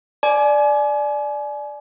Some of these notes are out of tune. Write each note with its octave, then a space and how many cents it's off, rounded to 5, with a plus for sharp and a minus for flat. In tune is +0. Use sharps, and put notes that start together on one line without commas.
D5 +0 G#5 +35